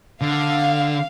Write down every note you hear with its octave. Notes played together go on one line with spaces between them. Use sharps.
D3 F5